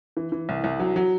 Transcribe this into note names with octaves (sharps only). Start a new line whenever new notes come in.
E3
E3
C2
C2
F#3
F#3